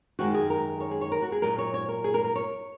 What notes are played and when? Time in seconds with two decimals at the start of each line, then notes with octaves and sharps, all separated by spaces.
0.19 F#2 D#3 G#3 F#4
0.34 G#4
0.50 A#4
0.80 C#5
0.91 G#4
1.01 C#5
1.12 A#4
1.22 F#4
1.32 G#4
1.42 A#2 F#3 A#4
1.58 C#5
1.74 C#5
1.89 A#4
2.04 G#4
2.14 A#4
2.24 A#4
2.36 C#5